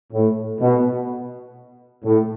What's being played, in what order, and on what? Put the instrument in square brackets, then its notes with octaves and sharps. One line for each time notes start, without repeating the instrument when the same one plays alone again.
[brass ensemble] A2
B2
A2